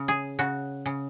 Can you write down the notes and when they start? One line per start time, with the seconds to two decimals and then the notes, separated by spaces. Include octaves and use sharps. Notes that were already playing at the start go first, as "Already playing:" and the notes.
Already playing: C#3
0.08 G#4
0.39 C#3 F#4
0.86 C#3